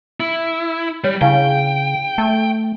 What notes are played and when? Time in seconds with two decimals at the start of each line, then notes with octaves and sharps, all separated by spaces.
0.20 E4
1.04 G3 C#5
1.21 C#3 D4 E4 F5 G5
2.18 A3 A5